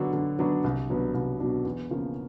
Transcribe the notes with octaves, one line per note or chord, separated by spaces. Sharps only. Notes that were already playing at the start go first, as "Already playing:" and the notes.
Already playing: D3 F#3 B3 D4 F#4
D3
F#3 B3 D4 F#4
C2
B2 F#3 B3 D4
C2
B2 F#3 B3 D4
E2
C#3 F3 A#3